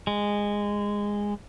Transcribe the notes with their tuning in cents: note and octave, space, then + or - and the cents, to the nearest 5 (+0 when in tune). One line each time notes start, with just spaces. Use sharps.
G#3 -15